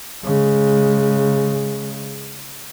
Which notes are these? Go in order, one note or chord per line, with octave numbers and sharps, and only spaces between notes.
C#3 G#3